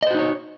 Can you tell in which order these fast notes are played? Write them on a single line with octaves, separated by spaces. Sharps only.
D#5 C5 F#4 D#4 C#5